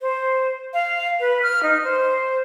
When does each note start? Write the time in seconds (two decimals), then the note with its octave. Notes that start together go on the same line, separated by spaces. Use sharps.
0.01 C5
0.74 F5
1.20 B4
1.43 F6
1.63 D#4
1.84 C5